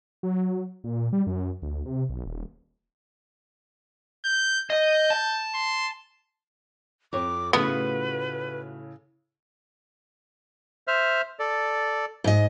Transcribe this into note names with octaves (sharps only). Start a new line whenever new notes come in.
F#3
A#2
G3
F#2
D2
C3
B1
D#1
G6
D#5 G6
A5
C6
F2 C#5 D6
A2 C#3 A3 B3 F4 F#4 B4
C5 E5 F6
A4 D5
G#2 D#5